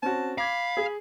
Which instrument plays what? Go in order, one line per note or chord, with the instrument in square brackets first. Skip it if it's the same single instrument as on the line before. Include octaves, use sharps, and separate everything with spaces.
[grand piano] C4 C#4 F#4 [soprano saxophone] A5
[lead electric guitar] F5 [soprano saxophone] B5 [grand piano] D6 G#6
[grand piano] G#4